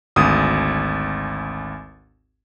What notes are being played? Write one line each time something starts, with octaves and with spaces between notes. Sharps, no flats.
G#1 D2 D#6